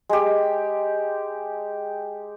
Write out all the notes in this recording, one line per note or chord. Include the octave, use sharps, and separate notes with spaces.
G#3 G4